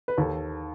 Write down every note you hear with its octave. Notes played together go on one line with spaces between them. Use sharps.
B4
D#2 A4